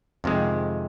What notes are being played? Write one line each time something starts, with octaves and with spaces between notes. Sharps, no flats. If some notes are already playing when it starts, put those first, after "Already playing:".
F2 C3 D#3 G#3 C4